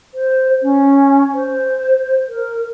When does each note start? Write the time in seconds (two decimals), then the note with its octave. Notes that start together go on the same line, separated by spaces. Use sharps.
0.14 C5
0.63 C#4
1.34 C5
2.29 A#4